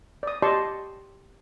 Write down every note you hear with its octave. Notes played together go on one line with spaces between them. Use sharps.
D5 D#6
G4 D5 D#5 A5 C6 C#6